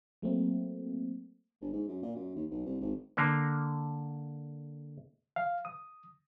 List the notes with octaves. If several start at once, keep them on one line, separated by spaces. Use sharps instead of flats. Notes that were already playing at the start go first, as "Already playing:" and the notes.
F#3 A3 A#3 C4
G1
G#2
F#2
A#2
F#2
D#2
B1
C2
G#1
D3 A#3
F5
D#6